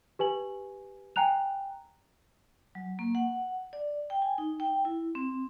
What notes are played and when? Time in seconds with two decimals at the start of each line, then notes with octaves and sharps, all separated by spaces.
0.19 G4 B4 G#5 F#7
1.16 G5 G#5 A#5 F#6 F7
2.75 F#3
2.99 A#3
3.15 F#5
3.73 D5
4.10 G5
4.22 G#5
4.38 D#4
4.60 G5
4.85 E4
5.15 C4